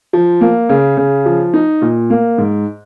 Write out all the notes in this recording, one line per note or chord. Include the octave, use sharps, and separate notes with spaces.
F3
A#3
C#3
C#3
F3
D#4
A#2
A#3
G#2